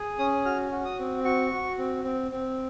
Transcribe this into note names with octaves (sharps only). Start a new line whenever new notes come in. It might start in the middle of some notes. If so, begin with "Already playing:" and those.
Already playing: G#4
C#4 D#6
F#4 F6
F#4
D#6
C4
F#4 C#6
F#4
C4
C4
C4